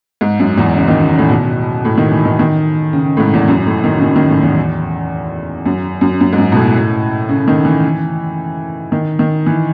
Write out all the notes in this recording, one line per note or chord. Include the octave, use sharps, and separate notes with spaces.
G#2
F#2
E2
C#3
D#3
C#3
A2
B2
A2
D#3
E3
D#3
D#3
C#3
A2
G#2
E2
F#2
A2
D#3
C#3
D#3
D#3
A2
E2
F#2
F#2
F#2
G#2
F#2
B2
A2
C#3
D#3
E3
D#3
D#3
E3